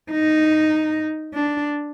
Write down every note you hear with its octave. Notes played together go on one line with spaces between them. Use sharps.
D#4
D4